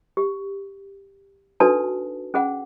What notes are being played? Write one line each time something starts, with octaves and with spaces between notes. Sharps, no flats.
G4
D4 D#4 F#4 A4 B4 A5
C#4 G#4 F#5